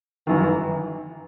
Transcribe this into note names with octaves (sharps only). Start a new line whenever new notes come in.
G1 F#2 D#3 E3